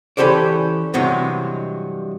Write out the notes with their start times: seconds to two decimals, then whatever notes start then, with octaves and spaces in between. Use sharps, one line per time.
0.17 E3 C#4 G4 A4 C5 D5
0.94 G2 C3 E3 F#3 G#3